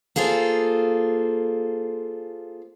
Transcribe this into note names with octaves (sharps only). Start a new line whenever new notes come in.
A#3 F4 G#4 A4 C5